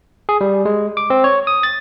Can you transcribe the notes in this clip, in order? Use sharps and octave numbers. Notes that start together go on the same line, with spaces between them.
G#4
G3
G#3
D6
C4
C#5
D#6
A6